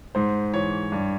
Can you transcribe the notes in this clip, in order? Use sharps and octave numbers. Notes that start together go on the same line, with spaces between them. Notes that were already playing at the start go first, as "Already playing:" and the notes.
G#2 C5
E3 C#5
G2